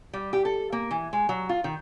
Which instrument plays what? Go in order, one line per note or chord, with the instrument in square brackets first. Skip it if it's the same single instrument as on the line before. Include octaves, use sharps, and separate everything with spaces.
[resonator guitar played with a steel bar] G3
G4
A4
A#3
E3
G#3
F#3
F4
D#3